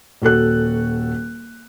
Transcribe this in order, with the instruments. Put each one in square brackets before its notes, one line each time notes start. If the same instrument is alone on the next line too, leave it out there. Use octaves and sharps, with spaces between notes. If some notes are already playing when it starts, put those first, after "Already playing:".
[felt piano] D#1 F#4 A4 F#6